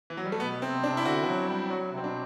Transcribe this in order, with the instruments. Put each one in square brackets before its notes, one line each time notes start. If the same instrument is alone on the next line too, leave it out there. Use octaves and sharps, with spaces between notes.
[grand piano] E3
F#3
G3
A3
[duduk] B2 [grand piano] B3
[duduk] C3 [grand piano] C4
[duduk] C3 [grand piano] D4
[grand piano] E4
[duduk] D3 [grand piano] F#4
[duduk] F#3
G3
[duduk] F#3 [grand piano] F#4
[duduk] C3 [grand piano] C4
[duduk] B2 [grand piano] D4